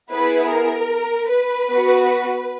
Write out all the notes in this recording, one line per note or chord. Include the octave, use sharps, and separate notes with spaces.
B3 E4 G#4 B4
A#4
B4
B3 F#4